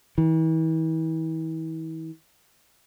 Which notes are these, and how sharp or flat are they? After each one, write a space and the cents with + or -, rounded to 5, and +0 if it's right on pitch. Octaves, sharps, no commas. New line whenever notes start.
E3 -40